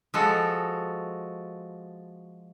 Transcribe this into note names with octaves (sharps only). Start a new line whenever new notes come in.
F3 G#3 F#4 A4